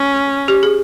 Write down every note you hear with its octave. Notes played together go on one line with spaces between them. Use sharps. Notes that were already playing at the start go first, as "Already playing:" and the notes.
Already playing: C#4
G4
G#4